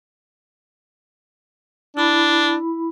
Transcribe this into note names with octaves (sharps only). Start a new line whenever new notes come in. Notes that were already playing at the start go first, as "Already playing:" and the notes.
D4 E4 B5